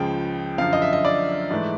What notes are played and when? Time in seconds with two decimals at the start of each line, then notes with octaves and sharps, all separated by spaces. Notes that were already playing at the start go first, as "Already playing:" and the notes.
Already playing: C#2 C#3 F3 G5
0.58 F#2 D3 F3 F5
0.73 D#5
0.82 E5
0.93 D#5
1.05 D5
1.51 G#2 E3 A3